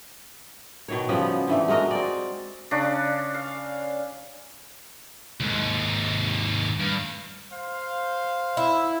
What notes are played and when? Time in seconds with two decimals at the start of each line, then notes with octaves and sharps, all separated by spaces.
0.88 B2 D#3 C#5
1.09 C#3 F3 G3 B3
1.48 D3 E3 A3
1.68 G#3 F#4 A#4 D#5
1.91 C4 D5
2.71 C#3 D4
3.34 F5
5.40 D#2 G#2
6.80 G2
7.51 C5 F5
8.57 E4